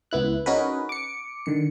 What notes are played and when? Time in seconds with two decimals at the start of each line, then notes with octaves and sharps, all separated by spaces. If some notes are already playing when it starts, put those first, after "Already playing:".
0.11 C#2 B3 E4 F#6
0.46 C#4 D#4 F#4 G#4 A#4 B4
0.89 D6 C#7
1.46 D3 D#3 C#7